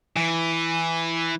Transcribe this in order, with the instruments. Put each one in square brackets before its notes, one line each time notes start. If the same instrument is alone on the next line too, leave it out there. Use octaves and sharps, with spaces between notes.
[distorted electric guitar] E3